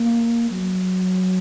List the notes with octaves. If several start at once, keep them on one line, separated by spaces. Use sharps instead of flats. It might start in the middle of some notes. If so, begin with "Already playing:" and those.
Already playing: A#3
F#3